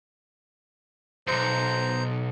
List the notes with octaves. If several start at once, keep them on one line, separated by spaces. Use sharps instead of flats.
B1 E2 C5 A#5